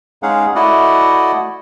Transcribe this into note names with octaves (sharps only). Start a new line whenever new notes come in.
G#3 C#4 D#4 G#4 F5 F#5
A3 E4 F#4 D5 D#5 F#5